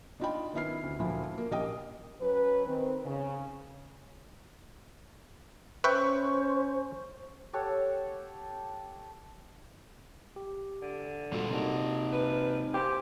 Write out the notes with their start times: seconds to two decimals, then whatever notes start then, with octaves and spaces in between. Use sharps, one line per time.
0.20 D4 D#4 F4 D#5 G5 B5
0.53 D#3 B3 E4 F6 C7
0.83 D2
0.99 D2 A#2 F3 E4
1.38 A#3 A#4
1.51 A#1 G4 A#4 D#5 G5 D#6
2.21 F#3 C#4 B4
2.67 D#3 C4
3.05 C#3
5.84 C#4 B4 C5 E5 G5 C#6
7.53 G4 A4 C#5 F#5
10.36 G4
10.82 D3
11.32 A#2 G3 G#3 F4 F#4 A4
11.50 C3 A#3 C4 D#4 F#4
12.12 B4
12.74 G4 C5 C6